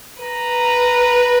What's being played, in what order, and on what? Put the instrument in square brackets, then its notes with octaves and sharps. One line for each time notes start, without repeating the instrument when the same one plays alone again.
[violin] B4 [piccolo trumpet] A#5